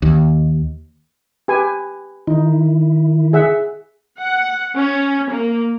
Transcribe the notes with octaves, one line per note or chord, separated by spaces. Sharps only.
D#2
G4 B4 G#5
D#3 D#4 E4
G#4 E5 F#5
F#5
C#4
A#3